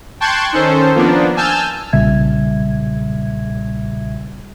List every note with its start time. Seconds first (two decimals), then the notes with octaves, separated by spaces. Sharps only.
0.20 G5 A5 C6 C#6 F#6 G#6
0.53 D#3 C#4 A4 C5
0.95 F3 A#3 B3 D4
1.36 G#5 A5 E6 F6 G6
1.93 B1 A#2 C#3 G3 E5 G#6